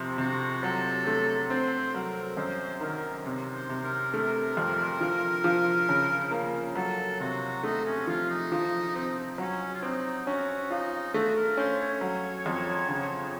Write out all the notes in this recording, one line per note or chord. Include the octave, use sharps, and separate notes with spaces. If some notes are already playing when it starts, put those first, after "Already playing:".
Already playing: F2 C3
C3 F#4
F#3 A4
A3
C4 C5
F#3 A#4
F#2 C5
D#3 A#4
C3
C5
C3
A#4
A3 A#4
F2
F3
F3
C#3
A#3
F#3 A4
C3 F#4
A3 D#4
C#4
F3 F4
D#4
F3
C4
F#3 C#4
F4
C4 D#4
C#4 F#4
D#4 F4
A3 F#4
A#4
C#4 C5
C#5
F#3
F2
C#3